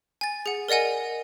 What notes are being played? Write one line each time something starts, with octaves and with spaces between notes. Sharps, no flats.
G#5 A6
G#4 F#5
A#4 D5 D#5 F#5 G#5